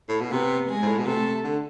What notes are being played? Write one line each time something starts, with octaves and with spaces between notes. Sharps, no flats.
A2
B2
C3 B3 B4
G#3 G#4
G#2
A2
B2
C3 A3 A4
D3